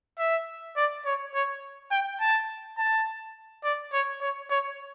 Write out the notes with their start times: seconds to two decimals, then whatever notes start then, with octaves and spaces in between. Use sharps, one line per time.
0.19 E5
0.77 D5
1.05 C#5
1.34 C#5
1.91 G5
2.21 A5
2.78 A5
3.64 D5
3.93 C#5
4.21 C#5
4.50 C#5